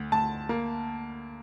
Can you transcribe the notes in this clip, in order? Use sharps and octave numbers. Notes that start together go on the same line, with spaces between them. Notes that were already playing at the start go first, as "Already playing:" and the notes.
Already playing: D2
D2 A5
A#3